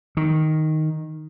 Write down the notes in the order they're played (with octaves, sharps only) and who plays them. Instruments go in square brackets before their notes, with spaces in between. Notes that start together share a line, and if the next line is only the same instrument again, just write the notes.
[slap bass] D#3